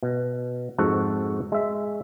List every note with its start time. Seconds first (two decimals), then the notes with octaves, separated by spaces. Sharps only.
0.03 B2
0.78 F2 G#2 F#4 A4 F#5
1.52 G#3 E5